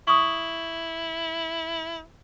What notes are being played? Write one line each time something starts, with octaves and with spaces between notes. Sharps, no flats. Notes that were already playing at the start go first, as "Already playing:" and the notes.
E4 C#6 D#6